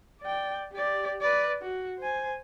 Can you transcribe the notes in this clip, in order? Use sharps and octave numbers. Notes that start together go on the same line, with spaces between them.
D5 G5
G4 D5
B4 D5
F#4
C5 G#5